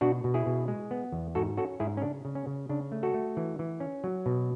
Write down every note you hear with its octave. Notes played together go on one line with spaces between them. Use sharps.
B2 D4 F#4
B2
E4 G#4
B2
G#3
B3
E2
G#2 F#4 A4
C#4 F#4 A4
G#2 E4 G#4
C#4
C#3 D4
C#3
C#4
C#3
C#3 D4
A3
F#4 A4
A3
E3
E3
C#4
F#3
B2